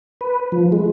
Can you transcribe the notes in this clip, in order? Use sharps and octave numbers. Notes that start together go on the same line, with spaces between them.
B4
F3
G#3